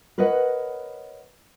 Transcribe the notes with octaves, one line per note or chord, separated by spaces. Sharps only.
A#4 B4 C#5 D#5 F#5